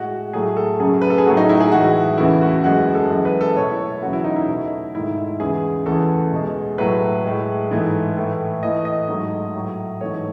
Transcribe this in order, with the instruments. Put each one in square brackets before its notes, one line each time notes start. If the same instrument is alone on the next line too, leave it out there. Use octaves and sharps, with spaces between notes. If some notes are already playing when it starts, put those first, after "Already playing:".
Already playing: [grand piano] A2 G#3 F#4
A2 F#3 A3 G#4
A4
F#2 C#3 F#3 A3 G#4
B4
A4
G#4
A2 F#3 A3 F#4
D#4
E4
G#4
A2 E3 G#3 F#4
E2 C#3 E3 A3 E4
F#4
F#2 E3 G#3 F#4
A4
F#2 E3 G#3
B4
A4
B2 A3 C#5
E4
E2 C#3 F#3 A3 F#4
E4
D#4
E4
B2 A3
G#2 D#3 A3 E4
E4
E2 C#3 G#3 G#4
E2 C#3 E3 A3 A4
B2 G#3
A2 F#3 A3 B4
A2 G#3
G#2 E3 A3
A2 E3 A3
A2 E3 A3 D#5
D#5
G#2 F#3 A3
A2 F#3 A3
G#2 E3 A3 C#5